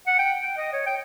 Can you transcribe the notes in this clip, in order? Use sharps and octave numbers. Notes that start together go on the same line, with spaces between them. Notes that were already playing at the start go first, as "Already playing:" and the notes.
F#5
G5
G5
D#5
C#5
G5